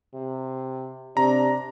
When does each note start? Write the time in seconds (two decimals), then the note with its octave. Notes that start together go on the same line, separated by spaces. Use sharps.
0.14 C3
1.17 C3 D4 A#5